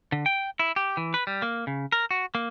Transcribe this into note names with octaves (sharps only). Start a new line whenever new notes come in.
D3
G5
E4
G4
E3
B4
G3
A#3
C#3
A#4
F#4
A#3